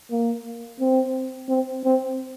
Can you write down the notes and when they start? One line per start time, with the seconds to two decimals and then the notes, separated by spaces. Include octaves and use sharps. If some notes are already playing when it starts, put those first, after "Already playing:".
0.11 A#3
0.80 C4
1.49 C4
1.84 C4